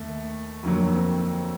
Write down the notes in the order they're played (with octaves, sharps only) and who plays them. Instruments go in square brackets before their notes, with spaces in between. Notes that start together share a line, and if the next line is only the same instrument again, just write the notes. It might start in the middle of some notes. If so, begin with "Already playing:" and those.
Already playing: [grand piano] D#2 [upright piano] A3
[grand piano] F2 D3 F#3 [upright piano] A#3
[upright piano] C4